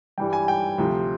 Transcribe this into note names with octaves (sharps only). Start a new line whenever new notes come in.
G2 E3 G3 G5
G#5
G5
D2 C3 F3